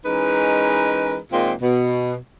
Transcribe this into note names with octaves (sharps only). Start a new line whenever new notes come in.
E3 G#3 C#4 D#4 A#4 B4
A#2 D#3 G#3 C4 F4
B2